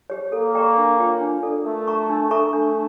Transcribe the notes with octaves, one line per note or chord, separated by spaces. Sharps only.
G4 C#5
A#3 A4
D5 G5 A#5 C#6
D4
F4 C#5 G5
D4
A4 D5
A3 A#4
E5 A#5 C#6
D4
A4 E5 A#5 C#6
A3 D4